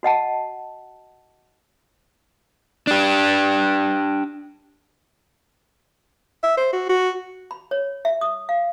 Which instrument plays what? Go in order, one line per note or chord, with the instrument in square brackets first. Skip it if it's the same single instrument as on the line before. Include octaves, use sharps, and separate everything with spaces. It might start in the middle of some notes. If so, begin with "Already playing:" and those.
[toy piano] F#4 D#5 F#5 A5
[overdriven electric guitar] D4 G4
[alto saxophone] E5
C5
F#4
F#4
[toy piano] B5
C#5
E5
D#6
F5